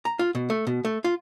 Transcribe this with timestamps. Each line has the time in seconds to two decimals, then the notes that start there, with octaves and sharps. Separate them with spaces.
0.05 A#5
0.19 F4
0.35 B2
0.50 A3
0.67 B2
0.85 A3
1.04 F4